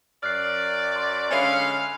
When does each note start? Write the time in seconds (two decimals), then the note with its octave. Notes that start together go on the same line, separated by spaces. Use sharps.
0.23 F#2 D5 F6 F#6 C7
0.96 C6
1.31 D3 G#3 C#4 F5 G#5 B5